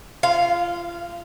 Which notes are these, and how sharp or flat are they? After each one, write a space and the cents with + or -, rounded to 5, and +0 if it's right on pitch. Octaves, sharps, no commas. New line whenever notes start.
F4 -25 F5 +0